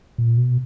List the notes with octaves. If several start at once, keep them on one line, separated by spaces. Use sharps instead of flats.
A#2
B2